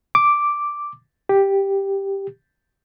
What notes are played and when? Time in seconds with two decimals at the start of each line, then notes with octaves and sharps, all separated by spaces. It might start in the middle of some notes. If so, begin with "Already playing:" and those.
0.15 D6
1.29 G4